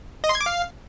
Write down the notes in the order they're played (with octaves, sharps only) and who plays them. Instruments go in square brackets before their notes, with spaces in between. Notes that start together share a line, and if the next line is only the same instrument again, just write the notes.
[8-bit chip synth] D#5
C6
G#6
D6
F5